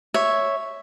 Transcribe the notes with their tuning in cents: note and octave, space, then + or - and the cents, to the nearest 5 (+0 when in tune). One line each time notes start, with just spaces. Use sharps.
C#5 +0 E5 +0